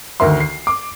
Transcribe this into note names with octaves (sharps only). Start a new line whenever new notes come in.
D2 D#3 A#4 E5 C6
C7
D6